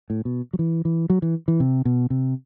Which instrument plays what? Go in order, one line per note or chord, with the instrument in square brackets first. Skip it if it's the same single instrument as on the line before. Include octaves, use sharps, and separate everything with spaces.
[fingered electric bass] A2
B2
F#3
E3
E3
F#3
E3
E3
C3
B2
C3